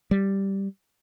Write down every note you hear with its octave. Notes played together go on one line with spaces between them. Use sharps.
G3